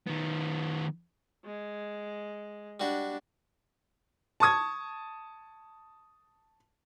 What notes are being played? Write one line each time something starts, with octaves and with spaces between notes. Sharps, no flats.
D#3 B3
G#3
G3 D4 F#4
A5 C#6 D#6 G#6